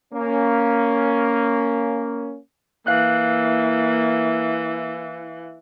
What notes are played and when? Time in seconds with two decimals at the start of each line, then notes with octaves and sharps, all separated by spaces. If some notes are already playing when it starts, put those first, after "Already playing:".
0.13 A#3 C#4
2.87 E3 A#3 F5 F#6